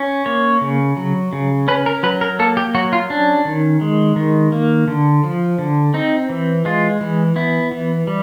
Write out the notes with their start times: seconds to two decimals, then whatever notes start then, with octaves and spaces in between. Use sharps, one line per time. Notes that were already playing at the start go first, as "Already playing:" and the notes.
Already playing: C#4
0.26 A#3 C#5
0.61 C#3
0.97 F#3
1.33 C#3
1.68 C#4 B4
1.86 A#4
2.03 F#3 B4
2.21 A#4
2.39 A#3 A4
2.57 G4
2.75 F#3 F#4
2.93 F4
3.10 C#4 D4
3.45 D#3
3.81 G#3
4.16 D#3
4.52 A#3
4.88 D3
5.24 F3
5.58 D3
5.94 C4 D#4
6.30 E3
6.65 G#3 F4
7.01 E3
7.36 B3 E4
7.72 E3
8.07 G3